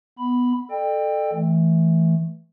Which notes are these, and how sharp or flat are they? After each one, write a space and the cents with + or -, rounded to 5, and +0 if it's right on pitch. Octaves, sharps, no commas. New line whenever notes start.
B3 +0 B5 +0
A4 +0 D5 +45 G5 +15
E3 +0 A3 -15